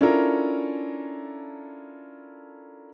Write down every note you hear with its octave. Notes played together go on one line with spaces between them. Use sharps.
C#4 D4 E4 F4 A4 A#4